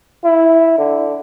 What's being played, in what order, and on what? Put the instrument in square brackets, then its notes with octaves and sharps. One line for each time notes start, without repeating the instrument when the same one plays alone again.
[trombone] E4
D3